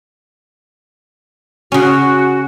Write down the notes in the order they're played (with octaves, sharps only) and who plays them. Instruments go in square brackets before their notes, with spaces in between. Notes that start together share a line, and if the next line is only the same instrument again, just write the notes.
[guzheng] C#3 C#4 [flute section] F#4